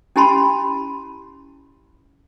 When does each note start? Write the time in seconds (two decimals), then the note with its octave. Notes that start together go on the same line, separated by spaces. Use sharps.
0.16 C#4 E4 G4 A5 B5 C6